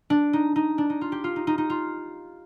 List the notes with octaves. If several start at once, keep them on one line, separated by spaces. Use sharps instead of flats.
D4
D#4
D#4
D4
D#4
F4
G4
F4
D#4
D#4
D#4
F4